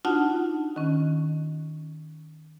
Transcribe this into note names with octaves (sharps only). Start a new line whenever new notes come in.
D4 D#4 F4 F#4 F#5 A5
D#3 C#4